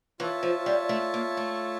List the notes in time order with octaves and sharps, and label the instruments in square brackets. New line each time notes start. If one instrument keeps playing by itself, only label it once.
[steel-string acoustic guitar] E3 [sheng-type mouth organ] F4 C#5 E5 A5
[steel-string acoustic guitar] F3
G3
A3
A#3
A3